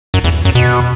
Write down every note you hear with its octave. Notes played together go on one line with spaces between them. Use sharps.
F#2
E2
F#2
B2